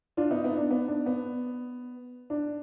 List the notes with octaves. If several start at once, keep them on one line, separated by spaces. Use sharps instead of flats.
D4 F4
B3 D#4
B3 D#4
D4
B3
D4
B3
D4